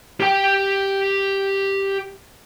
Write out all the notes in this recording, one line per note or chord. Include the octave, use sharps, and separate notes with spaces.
G4 G5